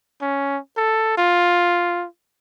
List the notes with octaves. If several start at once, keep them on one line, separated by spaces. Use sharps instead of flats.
C#4
A4
F4